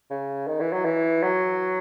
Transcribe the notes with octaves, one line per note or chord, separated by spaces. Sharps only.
C#3
D#3
E3
F#3
E3
F#3